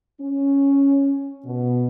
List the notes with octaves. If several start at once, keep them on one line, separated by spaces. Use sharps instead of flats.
C#4
B2